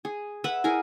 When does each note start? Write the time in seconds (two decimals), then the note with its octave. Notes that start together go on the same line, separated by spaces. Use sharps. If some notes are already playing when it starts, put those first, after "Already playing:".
0.05 G#4
0.44 B4 E5 F#5 B5
0.64 E4 G#4 A#4 G#5